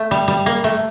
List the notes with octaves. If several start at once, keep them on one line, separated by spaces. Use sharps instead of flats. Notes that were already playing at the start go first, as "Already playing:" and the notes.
Already playing: A3
G3
G3
A#3
A3